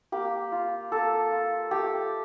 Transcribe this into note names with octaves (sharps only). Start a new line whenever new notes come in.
A#3 G4
F4
A#3 A4
F4
A3 G4